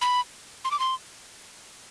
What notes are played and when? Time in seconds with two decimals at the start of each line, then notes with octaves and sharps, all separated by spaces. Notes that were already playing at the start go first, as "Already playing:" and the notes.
0.01 B5
0.65 C6
0.71 D6
0.80 C6